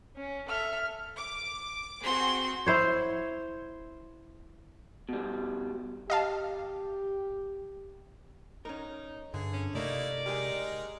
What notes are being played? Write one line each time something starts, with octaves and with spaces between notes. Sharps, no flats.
C#4
A4 E5 F6
D6
C4 F#4 G#4 C6
E4 C5 C#5
B2 G3
G4 D#5 F5 A5
C#4 D#4 A#4
G2 D3 G#4
C#4
C3 A3 A#3 D#4 E4 D5
G#3 D#4 G4 G#4 A#4